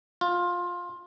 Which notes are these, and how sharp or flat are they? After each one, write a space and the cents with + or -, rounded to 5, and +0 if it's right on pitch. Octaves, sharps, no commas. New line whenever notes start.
F4 +15